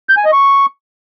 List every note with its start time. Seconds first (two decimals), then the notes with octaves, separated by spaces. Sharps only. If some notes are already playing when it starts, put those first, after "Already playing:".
0.09 G6
0.17 G#5
0.25 D#5
0.33 C#6